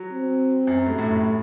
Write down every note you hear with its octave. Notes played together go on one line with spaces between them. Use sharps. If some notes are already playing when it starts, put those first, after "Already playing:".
Already playing: F#3
C4
F#2
G2 A3
A2
A2